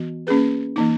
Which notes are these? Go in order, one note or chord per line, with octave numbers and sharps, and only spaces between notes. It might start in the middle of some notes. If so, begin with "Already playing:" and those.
Already playing: E3 B3 F#4
A#3 C#4 G#4 B4
E3 A#3 D#4